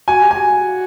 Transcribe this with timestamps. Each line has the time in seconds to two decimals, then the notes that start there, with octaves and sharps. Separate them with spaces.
0.08 F#4 G#5
0.22 G4
0.31 F#4 G#5